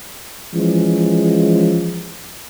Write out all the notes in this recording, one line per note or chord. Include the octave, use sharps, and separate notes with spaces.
E3 F3 G#3 C#4